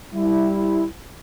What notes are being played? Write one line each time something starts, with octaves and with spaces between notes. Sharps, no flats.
G3 E4